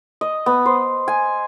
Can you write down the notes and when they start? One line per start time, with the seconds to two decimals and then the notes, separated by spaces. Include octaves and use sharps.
0.21 D#5
0.46 B3
0.66 C5
1.08 G#5